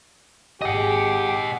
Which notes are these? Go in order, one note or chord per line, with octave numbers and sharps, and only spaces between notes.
G#1 G4 G#4 D#5 F#5